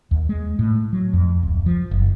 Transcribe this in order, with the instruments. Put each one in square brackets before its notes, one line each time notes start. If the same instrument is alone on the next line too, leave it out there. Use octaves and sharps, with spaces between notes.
[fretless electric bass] D#2
G#3
A2
F#3
F2
D1
F3
F#1